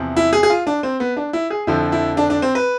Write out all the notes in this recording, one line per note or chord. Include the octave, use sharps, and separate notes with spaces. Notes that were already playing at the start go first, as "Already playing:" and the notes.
Already playing: E2 C3 F3
E4
G#4
G#4
F4
D4
C4
B3
D4
E4
G#4
F2 D3 F3 E4
E4
D4
D4
C4
B4